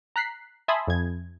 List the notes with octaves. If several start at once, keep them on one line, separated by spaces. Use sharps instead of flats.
A#5 F#6 B6 C7
E5 G#5 A5 B5 C6 D#6
F2 G#6